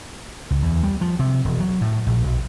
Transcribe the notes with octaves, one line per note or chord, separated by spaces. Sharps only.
C#2
E2
G3
F3
C3
E1
F#3
A2
A#1
B1